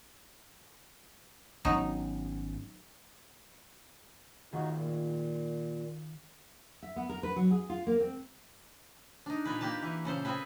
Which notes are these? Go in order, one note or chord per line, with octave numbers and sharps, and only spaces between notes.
G#1 F#3 B3 C#4 D#4
D#3 D#4 F4 F#4 G#4
A#2
E5
B3
A#4
B4
F#3
G#4
F4
A#3
C4
D4 D#4
A#2 F4 G#4 B4
A#3 G4 B4 A5
E3
A#2 C#3 A4 C5
C4 G#4 A4 B4